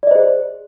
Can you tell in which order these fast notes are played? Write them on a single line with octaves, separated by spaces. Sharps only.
D5 D#5 C5 G#4